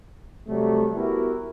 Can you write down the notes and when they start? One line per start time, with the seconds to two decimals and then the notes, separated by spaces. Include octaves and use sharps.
0.48 C3 F#3 G3 A3
0.96 B3 E4 F#4 G4 A#4